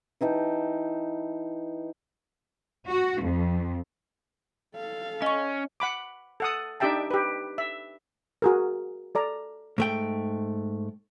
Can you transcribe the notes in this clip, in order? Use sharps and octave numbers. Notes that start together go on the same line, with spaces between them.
E3 D#4 G5 A5
F#4
F2
A4 F5
C#4 D#5 C#6
F#5 B5 D6
A4 F#5 D#6
D4 D#4 G4 E5 G5 A5
G4 B4
E5
F#4 G#4 A#4
A4 D5 A#5
G#2 A3 G5